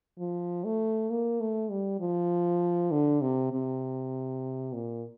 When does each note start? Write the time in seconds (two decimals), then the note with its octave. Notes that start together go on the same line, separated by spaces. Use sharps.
0.19 F3
0.64 A3
1.10 A#3
1.40 A3
1.70 G3
2.00 F3
2.91 D3
3.21 C3
3.52 C3
4.73 A#2